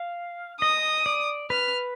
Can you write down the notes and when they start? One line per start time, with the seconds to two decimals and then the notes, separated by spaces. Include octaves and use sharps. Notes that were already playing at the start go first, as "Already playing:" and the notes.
Already playing: F5
0.61 D#5 D#6
1.06 D5
1.50 B4 F6